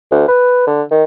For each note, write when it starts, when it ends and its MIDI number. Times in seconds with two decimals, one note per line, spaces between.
0.11 0.25 38
0.28 0.62 71
0.67 0.82 50
0.91 1.04 51